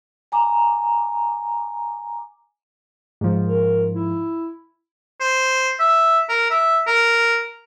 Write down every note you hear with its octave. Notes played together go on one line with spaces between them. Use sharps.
G#5 A#5 D6
G#2 F3
A#4
E4
C5
E5
A#4
E5
A#4